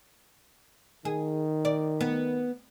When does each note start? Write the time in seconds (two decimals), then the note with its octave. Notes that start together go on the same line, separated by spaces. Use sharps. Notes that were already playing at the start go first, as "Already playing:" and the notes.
1.05 D#3 G#4
1.65 D5
2.01 B3